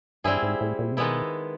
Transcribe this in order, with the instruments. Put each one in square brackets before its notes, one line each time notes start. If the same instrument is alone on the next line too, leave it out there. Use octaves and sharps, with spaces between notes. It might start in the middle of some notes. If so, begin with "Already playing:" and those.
[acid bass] G2 [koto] G3 C4 E4 G#4
[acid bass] G#2
A2
A#2
C3
[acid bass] B2 [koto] D#3 G#3 B3 E4